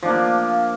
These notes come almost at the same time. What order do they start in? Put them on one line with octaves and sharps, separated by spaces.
F3 D4 A#3